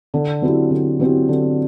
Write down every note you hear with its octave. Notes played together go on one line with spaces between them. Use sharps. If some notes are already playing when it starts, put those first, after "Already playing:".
D3
F#3 C4 E4 G4
D3
F#3 C4 E4 G4
D3